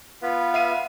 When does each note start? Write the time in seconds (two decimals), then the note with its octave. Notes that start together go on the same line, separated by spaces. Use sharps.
0.22 B3 F4 B4
0.54 E5 F5 D#7